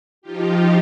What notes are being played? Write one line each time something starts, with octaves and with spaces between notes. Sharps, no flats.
F3 D#4 F4 G4